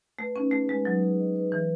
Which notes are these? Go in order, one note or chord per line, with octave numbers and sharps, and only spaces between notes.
A3 B4
C#4 D#4
A3 G#4
G#3 B4
F#3 D#4
G#4
D#5
B4
E3 B4